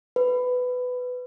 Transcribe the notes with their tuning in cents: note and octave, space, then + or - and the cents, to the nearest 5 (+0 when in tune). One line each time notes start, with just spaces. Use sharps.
B4 +15